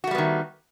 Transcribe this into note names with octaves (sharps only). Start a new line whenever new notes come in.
D#3 G3 A3 B3 F#4